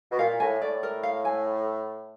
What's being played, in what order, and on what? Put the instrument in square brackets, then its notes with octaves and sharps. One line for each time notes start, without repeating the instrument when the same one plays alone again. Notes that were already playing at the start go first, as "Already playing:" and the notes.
[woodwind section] B2
[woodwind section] A#2 [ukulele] F5
[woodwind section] A2 [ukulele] G#5
[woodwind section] A2 [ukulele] D5
[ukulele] A#4
F5
G#5